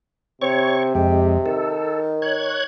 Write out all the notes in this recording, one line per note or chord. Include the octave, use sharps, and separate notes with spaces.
C3 C4 C#5 C#6
F2 G#3 G4
D#3 A4
C#5 F#6 G#6